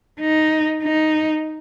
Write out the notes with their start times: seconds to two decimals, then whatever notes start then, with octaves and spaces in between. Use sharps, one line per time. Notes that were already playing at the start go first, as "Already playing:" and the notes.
0.20 D#4
0.83 D#4